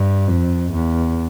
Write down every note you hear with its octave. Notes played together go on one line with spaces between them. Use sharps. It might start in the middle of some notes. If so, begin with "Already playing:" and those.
Already playing: G2
F2
E2